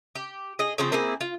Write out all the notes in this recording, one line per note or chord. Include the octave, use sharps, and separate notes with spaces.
G4
G#4 D#5
C#3 F3 C4
A#3 C4 E4 G#4
F4